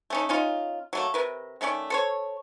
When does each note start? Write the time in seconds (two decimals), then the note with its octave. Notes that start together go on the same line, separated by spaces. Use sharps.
0.10 A3 C#4 D#4
0.29 C#4 D#4 F4
0.93 F#3 A3 A#3
1.14 C3 A#4 B4
1.61 D#3 A3 C#4 D5
1.90 A4 C5 C#5